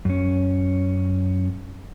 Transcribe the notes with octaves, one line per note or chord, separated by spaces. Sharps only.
F#2 C#4